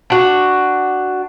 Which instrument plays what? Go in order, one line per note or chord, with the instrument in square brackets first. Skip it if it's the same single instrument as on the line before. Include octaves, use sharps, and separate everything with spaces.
[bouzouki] D4 F#4